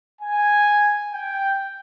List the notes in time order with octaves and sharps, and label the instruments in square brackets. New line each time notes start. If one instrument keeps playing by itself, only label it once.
[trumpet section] G#5
G5